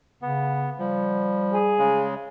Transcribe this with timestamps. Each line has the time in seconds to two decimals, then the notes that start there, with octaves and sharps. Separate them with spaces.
0.22 C#3 B3
0.79 F3 G3
1.53 G#4
1.79 C#3 G#3